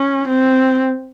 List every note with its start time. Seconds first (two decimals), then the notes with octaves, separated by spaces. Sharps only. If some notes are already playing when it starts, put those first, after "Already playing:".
Already playing: C#4
0.28 C4